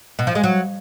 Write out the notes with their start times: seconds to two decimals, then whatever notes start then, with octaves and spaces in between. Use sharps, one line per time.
0.19 B2
0.27 F3
0.35 G#3
0.44 F#3